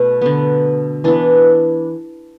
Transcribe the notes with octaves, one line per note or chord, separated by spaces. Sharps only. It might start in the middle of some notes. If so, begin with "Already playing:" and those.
Already playing: B2 A3 B4
D3 B3
E3 B3 D4